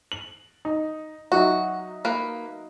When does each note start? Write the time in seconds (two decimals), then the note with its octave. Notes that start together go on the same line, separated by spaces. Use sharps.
0.12 F#7
0.65 D#4
1.32 F#3 D#4 F#4 E5
2.05 A#3 B4